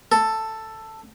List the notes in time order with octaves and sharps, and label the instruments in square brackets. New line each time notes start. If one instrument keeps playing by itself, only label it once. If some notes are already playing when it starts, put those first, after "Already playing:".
[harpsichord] A4